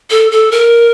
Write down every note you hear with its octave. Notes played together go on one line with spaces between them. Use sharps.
A4
A4
A#4